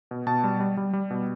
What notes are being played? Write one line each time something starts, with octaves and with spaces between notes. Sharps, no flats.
B2
B2 A5
G3
G3
G3
G3
B2